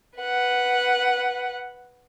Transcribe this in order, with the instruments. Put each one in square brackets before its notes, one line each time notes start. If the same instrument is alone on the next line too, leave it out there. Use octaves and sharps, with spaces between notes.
[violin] B4 F#5